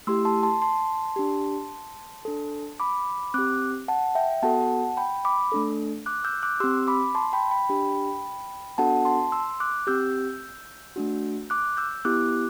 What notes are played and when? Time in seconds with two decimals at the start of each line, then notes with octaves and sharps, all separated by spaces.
0.07 A3 E4 G4 C6 E6
0.25 A5 C6
0.43 A5 C6
0.62 A5 C6
1.16 D4 G4
2.25 D4 A4
2.80 B5 D6
3.34 C4 G4 D6 F#6
3.88 F#5 A5
4.15 E5 G5
4.43 B3 F#4 A4 F#5 A5
4.97 G5 B5
5.25 B5 D6
5.52 A3 D4 A4
6.06 D6 F#6
6.24 E6 G6
6.43 D6 F#6
6.60 C4 G4 C6 E6
6.87 B5 D6
7.15 A5 C6
7.33 G5 B5
7.51 G5 B5
7.69 D4 G4
8.78 B3 D4 F#4 A4 F#5 A5
9.05 A5 C6
9.32 C6 E6
9.60 D6 F#6
9.87 C4 G4 E6 G6
10.96 A3 D4 F#4
11.50 D6 F#6
11.77 E6 G6
12.05 B3 E4 G4 D6 F#6